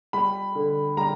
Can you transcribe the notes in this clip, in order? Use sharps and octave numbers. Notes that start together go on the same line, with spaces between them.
G3 B5
D3
G3 A#5